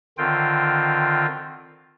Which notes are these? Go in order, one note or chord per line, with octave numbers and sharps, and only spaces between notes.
D3 D#3 C4 F4 G5